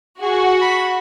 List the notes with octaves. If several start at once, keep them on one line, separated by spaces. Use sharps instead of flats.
F#4 G#4
B5